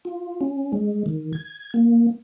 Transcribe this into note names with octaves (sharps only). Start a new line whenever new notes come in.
F4
C#4
G#3
D#3
G#6
A#3